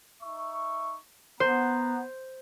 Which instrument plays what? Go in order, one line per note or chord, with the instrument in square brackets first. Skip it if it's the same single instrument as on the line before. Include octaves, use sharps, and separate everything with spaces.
[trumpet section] D#4 E5 C#6
[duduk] B3 [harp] C5 [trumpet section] F#5 A#5